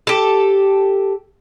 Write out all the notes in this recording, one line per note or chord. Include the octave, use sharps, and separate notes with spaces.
G4 A4